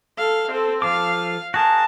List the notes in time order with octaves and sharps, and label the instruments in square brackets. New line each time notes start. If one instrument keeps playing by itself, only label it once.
[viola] A4 F5
C4 A4
[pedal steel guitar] F3 A4 D6 [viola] F5
[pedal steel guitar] F#4 G#4 A#4 [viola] A5